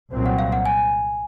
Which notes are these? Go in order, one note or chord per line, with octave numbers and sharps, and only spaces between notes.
C2 A#2 F#3 C4
F#5
F5
F#5
G#5